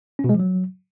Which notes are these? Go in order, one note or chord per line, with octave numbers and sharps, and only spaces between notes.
C#4
B2
G#3
F3
F#3